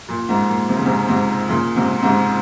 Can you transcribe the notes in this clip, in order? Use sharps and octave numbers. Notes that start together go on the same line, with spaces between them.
A#2
G#2
A#2
C3
C#3
G#2 C3
G#2 C3
A#2 C#3
G#2 C3
G#2 C3